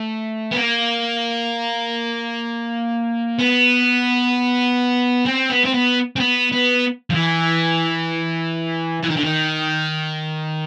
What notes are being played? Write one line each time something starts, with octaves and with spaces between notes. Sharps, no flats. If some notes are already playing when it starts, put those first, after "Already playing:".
Already playing: A3
B3
A#3
B3
C4
B3
C4
B3
C4
B3
B3
F3
E3
E3
D#3
D3
D#3